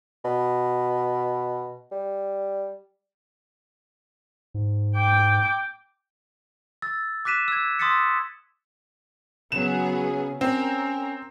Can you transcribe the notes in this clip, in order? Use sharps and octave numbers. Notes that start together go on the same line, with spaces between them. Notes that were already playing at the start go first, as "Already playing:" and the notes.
B2
G3
G#2
G5 D6
E6 A6
D6 F#6 B6 D#7 E7
E6 G#6
C6 D#6 E6 A6 B6 C#7
C#3 F#3 B3 G#4 E7
C4 C#4 A#4